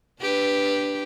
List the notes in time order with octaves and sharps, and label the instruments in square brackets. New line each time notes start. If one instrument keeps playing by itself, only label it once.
[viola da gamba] D4 G4 B4